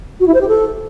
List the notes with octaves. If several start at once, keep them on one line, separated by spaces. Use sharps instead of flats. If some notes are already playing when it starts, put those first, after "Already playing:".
F#4
E4
C5
G4
A4